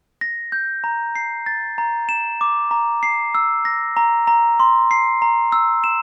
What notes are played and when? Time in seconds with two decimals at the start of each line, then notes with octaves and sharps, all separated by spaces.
0.21 A#6
0.52 G6
0.84 A#5
1.15 C7
1.46 A6
1.78 A#5
2.09 E7
2.41 D6
2.71 A#5
3.03 C7
3.35 E6
3.65 A#6
3.97 A#5
4.27 A#5
4.60 C6
4.91 C7
5.22 A#5
5.52 E6
5.84 E7